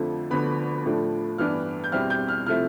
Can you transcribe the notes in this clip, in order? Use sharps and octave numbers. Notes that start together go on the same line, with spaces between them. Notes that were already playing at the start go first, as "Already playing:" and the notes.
Already playing: F2 D3 F3 A3
D2 D3 F3 B3 B5
A2 F3 A3 D4
G2 E3 B3 D4 F6
G6
E2 B2 G3 C4 E4 F6
G6
F6
C3 F3 A3 E4 F6